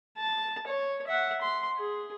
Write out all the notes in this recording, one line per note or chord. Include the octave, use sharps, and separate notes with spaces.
A5
C#5
E5 F#5
C6
G#4